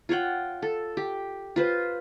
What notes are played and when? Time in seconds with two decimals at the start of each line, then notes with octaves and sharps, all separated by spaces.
0.09 F4 C#5 F#5 G5
0.62 A4
0.97 G4
1.56 F4 B4 C5